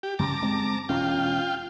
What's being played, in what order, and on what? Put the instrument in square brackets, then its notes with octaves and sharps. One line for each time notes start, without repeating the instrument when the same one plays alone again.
[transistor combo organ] G4
[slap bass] F#2 C#3 [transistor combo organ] A5 A#5 D6
[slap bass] G#3 C4
[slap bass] E1 C#4 [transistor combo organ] F4 G5